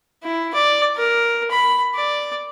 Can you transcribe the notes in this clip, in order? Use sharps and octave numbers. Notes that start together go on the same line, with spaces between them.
E4
D5
A#4
B5
D5